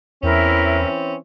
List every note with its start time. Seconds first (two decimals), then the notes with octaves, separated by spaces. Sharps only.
0.23 E2 E3 C4 C#4 E4 A#4 E5